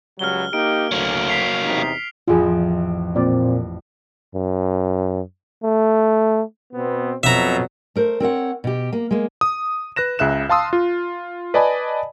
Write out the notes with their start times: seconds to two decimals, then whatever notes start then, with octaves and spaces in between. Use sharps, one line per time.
0.19 C#2 F#3 G3 F6 G7
0.53 A#3 D#4 G4 D7
0.92 D2 F#3 A#3
1.29 B6 C7 F7
1.66 E2 C3 D#4
2.28 A1 F2 F3 F4 G#4
3.16 A#2 C4 D5
4.35 F#2
5.64 A3
6.74 B2 B3 C4
7.23 F2 B2 F#3 E5 A#5
7.96 A3 A#4 C5
8.20 C4 A#4 C#5 F#5
8.64 B2 G4
8.93 A#3
9.11 G#3 A#3
9.41 D#6
9.96 B4 F#6 A#6 E7
10.19 C#2 C#3 E5 F#6 E7
10.49 F5 A5 C6 D#6 E6
10.73 F4
11.54 B4 D5 D#5 G#5 A5 B5